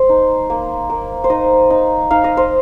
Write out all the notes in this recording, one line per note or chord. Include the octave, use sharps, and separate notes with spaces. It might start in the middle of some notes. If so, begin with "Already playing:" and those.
Already playing: C5
D#4
A#3
A#3
C5
D#4 D#5
D#4
D#4 F5
D#5
C5